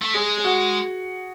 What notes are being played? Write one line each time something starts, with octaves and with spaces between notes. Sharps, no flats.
A3
G#3 G#4
G#4
F#4